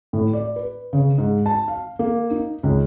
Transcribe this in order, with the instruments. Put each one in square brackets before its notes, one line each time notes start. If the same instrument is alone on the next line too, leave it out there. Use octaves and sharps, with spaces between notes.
[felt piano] A2
D5
B4
C#3
G#2
A5
F5
A#3
D#4
C#2